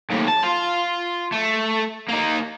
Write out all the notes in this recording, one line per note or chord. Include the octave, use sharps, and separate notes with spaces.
D#2 A2
A5
F4
A3
A#3 D#4